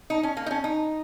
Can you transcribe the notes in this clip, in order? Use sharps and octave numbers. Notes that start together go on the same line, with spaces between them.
D#4
C#4
A#3
D#4
C#4
D#4